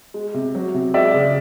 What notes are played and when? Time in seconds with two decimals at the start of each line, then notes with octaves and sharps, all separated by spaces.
0.14 G#3
0.34 C3
0.55 F#3
0.74 C3
0.94 G#3 D5 E5
1.14 C#3